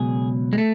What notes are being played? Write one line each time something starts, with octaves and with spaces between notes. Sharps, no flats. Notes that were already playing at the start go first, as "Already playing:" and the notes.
Already playing: C#2 B2 F#3 G#4
G#3
A3